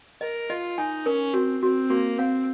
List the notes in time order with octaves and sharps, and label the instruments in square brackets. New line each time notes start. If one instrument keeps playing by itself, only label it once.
[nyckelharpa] A#4 [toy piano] D#5
[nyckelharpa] F4 [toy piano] D#5
[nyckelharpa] D#4 [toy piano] G#5
[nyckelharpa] C#4 [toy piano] A#4
[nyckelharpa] C4 [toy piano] F#4
[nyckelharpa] C4 [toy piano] F#4
[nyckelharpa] A#3 [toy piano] F#4
[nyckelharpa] C4 [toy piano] F5